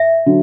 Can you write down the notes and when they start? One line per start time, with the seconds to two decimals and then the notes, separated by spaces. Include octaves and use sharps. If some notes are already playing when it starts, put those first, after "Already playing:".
Already playing: E5
0.26 D3 F#3